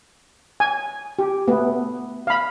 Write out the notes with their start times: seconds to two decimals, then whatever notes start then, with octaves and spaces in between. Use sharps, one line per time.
0.60 G#5
1.19 G4
1.48 A3 B3
2.27 F5 B5